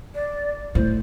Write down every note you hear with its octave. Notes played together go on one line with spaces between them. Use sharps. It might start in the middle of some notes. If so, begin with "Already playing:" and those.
D5
A2 C5